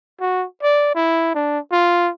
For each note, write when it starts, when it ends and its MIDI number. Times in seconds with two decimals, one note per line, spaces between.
0.20 0.46 66
0.62 0.91 74
0.95 1.34 64
1.35 1.59 62
1.72 2.10 65